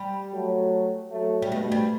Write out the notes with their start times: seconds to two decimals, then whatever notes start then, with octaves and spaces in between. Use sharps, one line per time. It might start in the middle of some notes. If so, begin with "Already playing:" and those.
Already playing: G3
0.32 F#3 A3
1.12 F#3 A3
1.42 G3
1.51 G2 B2 A3
1.72 G3